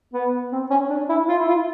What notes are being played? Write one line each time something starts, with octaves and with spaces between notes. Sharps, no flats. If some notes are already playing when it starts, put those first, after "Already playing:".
B3
C4
C#4
D4
E4
F4
E4
F4